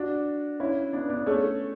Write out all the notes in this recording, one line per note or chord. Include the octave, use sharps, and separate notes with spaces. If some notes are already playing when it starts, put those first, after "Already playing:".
Already playing: D4 F#4
C#4 E4
B3 D4
B3 D4
A3 C#4